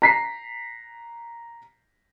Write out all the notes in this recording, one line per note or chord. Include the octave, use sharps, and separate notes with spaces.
A#5 B6 C7